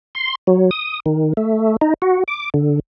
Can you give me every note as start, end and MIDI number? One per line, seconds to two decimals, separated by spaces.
0.15 0.35 84
0.47 0.70 54
0.71 1.00 87
1.06 1.33 51
1.37 1.76 57
1.81 1.94 63
2.02 2.23 66
2.28 2.50 86
2.54 2.80 50